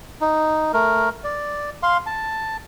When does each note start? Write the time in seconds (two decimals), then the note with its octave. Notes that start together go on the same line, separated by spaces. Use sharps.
0.21 D#4
0.73 A3 A#4
1.24 D5
1.83 F5 C6
2.06 A5